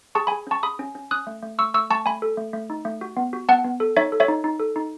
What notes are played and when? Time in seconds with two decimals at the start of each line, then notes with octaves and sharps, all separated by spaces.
0.15 G#4 A5 C#6
0.27 G#4 G#5 B5
0.47 C#4 A5 C#6
0.63 G#4 B5 D#6
0.79 C#4
0.95 C#4
1.11 C#4 D#6 F#6
1.27 A3
1.43 A3
1.58 A3 C#6 E6
1.74 A3 C#6 E6
1.90 A3 A5 C#6
2.06 A3 G#5 B5
2.22 A4
2.37 A3
2.53 A3
2.70 D#4
2.85 A3
3.01 F#4
3.17 B3
3.33 F#4
3.49 B3 F#5 A5
3.64 B3
3.80 A4
3.97 D#4 C#5 E5
4.12 A4
4.20 C#5 E5
4.28 D#4
4.44 D#4
4.60 A4
4.76 D#4